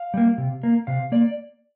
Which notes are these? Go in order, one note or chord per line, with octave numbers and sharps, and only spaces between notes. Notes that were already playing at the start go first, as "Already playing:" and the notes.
Already playing: F5
G3 A#3
C3
A#3
C3 F5
A#3 D5